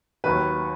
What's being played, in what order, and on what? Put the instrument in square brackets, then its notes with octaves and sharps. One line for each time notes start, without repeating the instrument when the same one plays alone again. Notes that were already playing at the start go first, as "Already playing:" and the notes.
[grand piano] D#2 D#3 F#3 B4